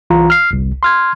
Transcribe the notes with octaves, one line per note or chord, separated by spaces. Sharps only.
C2 E3 F4 A#5
F6 C7
G1 C2
C6 F6 G#6